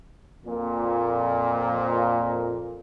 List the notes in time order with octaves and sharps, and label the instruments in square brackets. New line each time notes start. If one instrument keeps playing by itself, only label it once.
[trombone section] F2 A#2